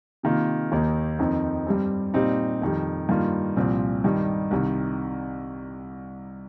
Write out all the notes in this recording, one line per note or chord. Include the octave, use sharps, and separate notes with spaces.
C3 D#3 A#3 F4
D#2 D#3 A#3 D#4
F2 D#3 C4 D#4
G2 G3 C4
A#2 G3 C4 D#4
F2 D#3 G3
G2 D#3 A#3 F4
C2 A#2 F3 C4
G2 D#3 G3 D#4
C2 C3 D#3